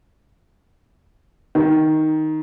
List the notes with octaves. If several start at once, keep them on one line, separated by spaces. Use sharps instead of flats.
D#3